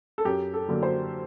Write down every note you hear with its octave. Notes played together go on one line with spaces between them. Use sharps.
A4
F#2 G4
A4
D3 F#3 A#3
C5